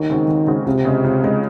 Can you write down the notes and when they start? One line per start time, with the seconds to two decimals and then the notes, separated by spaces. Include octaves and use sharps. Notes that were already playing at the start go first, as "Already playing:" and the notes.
Already playing: D#2 D#3
0.10 C#3 G#3 C4 F#4
0.28 D#2
0.47 C#3 G#3 C4 F#4
0.66 C#2 C3
0.85 C#3 G#3
1.04 C#2
1.23 C#3 G#3